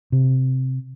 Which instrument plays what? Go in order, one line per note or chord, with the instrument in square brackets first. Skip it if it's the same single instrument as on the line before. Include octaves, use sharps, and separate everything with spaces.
[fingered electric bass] C3